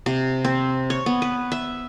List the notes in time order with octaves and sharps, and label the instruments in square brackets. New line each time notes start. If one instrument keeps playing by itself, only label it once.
[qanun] C3
C4
C#5
B3
B4
E5